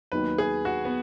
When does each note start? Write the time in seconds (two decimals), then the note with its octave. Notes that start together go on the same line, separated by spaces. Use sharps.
0.12 D#2 D#3 F#3 B3 D#4 B4
0.38 G#4
0.65 F#4
0.85 B3